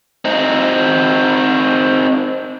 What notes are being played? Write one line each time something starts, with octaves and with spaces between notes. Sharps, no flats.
C4 D#4